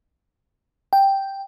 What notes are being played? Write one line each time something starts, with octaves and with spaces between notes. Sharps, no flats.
G5